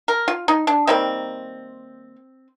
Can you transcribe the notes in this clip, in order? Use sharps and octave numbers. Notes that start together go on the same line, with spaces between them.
A#4
F4
D#4
D4
D#3 G3 A#3 C4